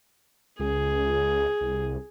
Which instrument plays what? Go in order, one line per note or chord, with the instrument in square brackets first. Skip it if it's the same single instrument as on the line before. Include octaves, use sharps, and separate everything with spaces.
[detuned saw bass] C#2 [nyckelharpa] G#4
[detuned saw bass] C2